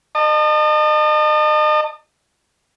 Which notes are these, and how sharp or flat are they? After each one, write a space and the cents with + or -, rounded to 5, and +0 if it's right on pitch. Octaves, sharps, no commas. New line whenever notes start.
D#5 -35 A5 +30